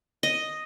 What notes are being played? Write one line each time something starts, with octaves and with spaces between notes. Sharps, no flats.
D#5